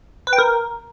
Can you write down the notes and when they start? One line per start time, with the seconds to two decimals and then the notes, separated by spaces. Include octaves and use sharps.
0.27 B4
0.33 G5
0.38 A#4